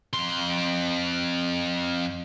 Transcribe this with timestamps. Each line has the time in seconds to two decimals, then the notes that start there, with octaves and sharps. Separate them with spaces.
0.13 F2 C6